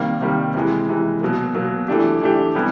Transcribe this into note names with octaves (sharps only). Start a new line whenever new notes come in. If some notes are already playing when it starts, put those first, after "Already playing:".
Already playing: C3 D#3 G3 A#3
C3 D#3 G3 A#3
C3 E3 G#3
C3 E3 G#3
B2 F#3 A#3
B2 F#3 A#3
E3 A3 D4 G4
E3 A3 D4 G4
C3 E3 G3 B3 E4